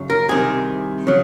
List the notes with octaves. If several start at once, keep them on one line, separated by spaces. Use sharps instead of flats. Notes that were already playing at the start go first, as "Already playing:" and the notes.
Already playing: F#2 C#3 F#3
A#4
C2 C3 D#3 G#4
C#3 F#3